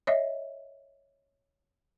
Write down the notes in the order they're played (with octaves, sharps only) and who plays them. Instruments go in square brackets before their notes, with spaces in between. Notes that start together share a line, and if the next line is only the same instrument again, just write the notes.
[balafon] C#5 D#5 E5